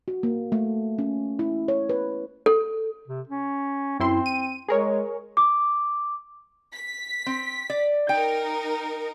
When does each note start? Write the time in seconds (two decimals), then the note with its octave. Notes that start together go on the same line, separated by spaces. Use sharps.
0.08 F#4
0.23 A#3
0.52 A3
0.99 C#4
1.39 E4
1.68 C#5
1.89 B4
2.46 A4
3.08 C3
3.29 C#4
4.00 F#2 C4 E4 C6
4.26 D#7
4.68 G#3 G#4 A#4 C#5
5.37 D6
6.75 B6
7.26 C4
7.70 D5
8.09 D#4 A#4 G5